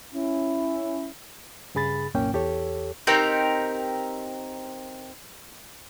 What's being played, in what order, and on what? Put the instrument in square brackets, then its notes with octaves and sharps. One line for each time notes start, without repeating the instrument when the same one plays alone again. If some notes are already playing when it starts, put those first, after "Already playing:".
[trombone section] C#4 E4
[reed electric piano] G2 C#3 G#4 B5 A6
C2 F#2 A#2 A#3 C#4 G5
E2 G4 A4 C#5
[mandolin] C4 D#4 G4 A#4